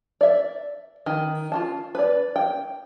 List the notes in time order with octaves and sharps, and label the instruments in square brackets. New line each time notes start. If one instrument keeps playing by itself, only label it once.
[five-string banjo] D5 E5
D#3
F4 F#4 A5
B4 D5
G5